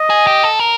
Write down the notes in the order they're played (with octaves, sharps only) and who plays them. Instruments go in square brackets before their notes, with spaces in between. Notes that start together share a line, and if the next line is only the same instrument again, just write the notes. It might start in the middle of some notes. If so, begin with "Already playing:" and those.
Already playing: [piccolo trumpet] D#5
[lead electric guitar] G#4
G4
A4
A#4